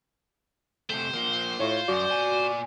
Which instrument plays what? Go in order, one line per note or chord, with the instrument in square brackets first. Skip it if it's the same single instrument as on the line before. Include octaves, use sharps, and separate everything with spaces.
[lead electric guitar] C3 A3 [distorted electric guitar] C5
[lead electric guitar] F3 A#3
[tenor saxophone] A2 [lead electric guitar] F4 [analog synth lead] C#5
[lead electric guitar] F#2 [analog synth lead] F#4 [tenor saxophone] D5
[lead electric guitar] A#2 G#5